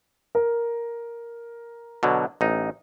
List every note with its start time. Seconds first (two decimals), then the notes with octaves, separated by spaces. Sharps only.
0.35 A#4
2.03 B2 D3 F#3
2.41 A1 D#4